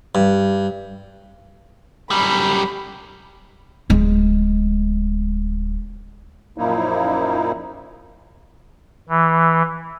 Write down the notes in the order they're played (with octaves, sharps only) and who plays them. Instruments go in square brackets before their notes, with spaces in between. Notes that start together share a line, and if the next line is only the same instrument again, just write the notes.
[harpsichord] G2
[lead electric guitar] F#2 G3 [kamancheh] B5
[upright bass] D1 G#3
[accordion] F#2 A#2 F3 A#3 D#4 E4
[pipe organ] E3